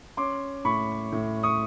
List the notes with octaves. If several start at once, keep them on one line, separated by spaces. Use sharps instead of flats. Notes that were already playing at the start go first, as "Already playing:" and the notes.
C#4 C6 D6
A2 B5 C#6
A2
C#6 D#6